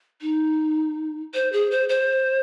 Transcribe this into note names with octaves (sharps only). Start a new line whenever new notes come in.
D#4
C5
G#4
C5
C5